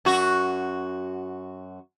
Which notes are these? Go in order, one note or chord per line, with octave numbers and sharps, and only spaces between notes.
F#2 F#4